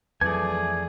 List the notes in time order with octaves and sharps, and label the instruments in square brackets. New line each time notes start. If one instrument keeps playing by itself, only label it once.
[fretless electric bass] F2 E3 [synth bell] F#3 [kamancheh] A3 G#4 [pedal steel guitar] D5 G#5